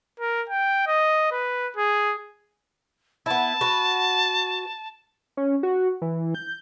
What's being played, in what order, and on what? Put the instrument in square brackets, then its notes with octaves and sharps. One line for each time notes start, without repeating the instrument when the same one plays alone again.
[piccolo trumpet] A#4
G5
D#5
B4
G#4
[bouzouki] B3 E4 [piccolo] A5
[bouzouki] F#4 B4
[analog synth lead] C#4
F#4
E3
G6